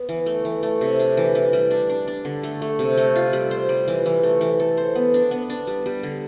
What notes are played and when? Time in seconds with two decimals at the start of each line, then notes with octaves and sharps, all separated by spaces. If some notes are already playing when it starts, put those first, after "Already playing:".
Already playing: B3
0.09 E3
0.26 A3
0.45 E3
0.63 A3
0.81 C3
0.99 D4
1.17 E3
1.35 E3
1.53 G3
1.71 D4
1.89 D4
2.07 D4
2.25 D3
2.43 A3
2.62 A3
2.79 C3
2.97 A3
3.16 F4
3.33 G3
3.51 C5
3.69 G3
3.88 E3
4.06 E3
4.23 A3
4.41 E3
4.60 A4
4.77 C5
4.95 B3
5.14 D4
5.31 B3
5.50 D4
5.67 G3
5.86 G3
6.03 D3